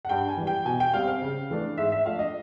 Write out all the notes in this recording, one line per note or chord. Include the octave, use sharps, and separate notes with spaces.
F#5
G2 G5
G#5
E3 G3
G5
B2 G#5
G5
G3 C4 F5
F5
C#3
E3 A3 D4
G#2 E5
E5
F3 A3 D4 F5
D#5